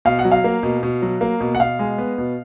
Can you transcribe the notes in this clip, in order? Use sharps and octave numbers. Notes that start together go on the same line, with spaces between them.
B2 F5
F#5
F#3
F5
A#3
B2
B2
F#3
A#3
B2
F#5
B2 F5
G#3
B3
B2